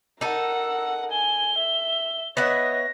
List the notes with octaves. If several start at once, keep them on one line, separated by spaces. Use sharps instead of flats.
D#4 A4 A#4 F#5 E6
G#5 G7
E5
B3 C#5 D#5 E5 F#5 A#6